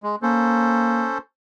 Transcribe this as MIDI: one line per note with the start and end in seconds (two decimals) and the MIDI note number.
0.03 0.16 56
0.22 1.09 58
0.22 1.18 61
0.22 1.18 69
0.22 1.18 72